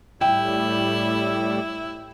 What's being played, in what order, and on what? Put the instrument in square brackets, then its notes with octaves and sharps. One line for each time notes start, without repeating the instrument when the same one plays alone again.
[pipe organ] A2 G3 [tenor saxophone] E4 [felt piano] G5